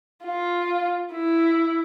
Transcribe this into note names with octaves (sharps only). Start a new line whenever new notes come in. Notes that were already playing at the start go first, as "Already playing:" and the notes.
F4
E4